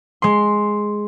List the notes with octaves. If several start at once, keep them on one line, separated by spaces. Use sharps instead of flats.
G#3 C6